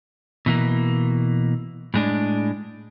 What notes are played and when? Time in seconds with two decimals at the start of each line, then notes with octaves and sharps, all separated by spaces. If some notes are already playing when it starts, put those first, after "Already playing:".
0.46 B2 E3 A#3
1.94 A2 G#3 D4